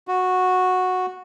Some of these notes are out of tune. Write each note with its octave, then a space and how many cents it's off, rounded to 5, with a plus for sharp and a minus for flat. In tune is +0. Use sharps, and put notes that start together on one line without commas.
F#4 -10